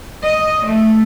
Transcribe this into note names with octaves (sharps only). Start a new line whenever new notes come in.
D#5
A3